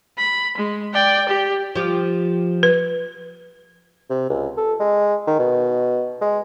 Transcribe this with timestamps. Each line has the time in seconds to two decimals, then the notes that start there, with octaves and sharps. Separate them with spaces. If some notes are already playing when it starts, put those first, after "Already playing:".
0.18 B5
0.58 G#3
0.94 D5 G5
1.29 G4
1.75 F3 G4
2.63 B4
4.10 C3
4.30 C#2
4.57 A4
4.80 G#3
5.27 D#3
5.39 B2
6.21 G#3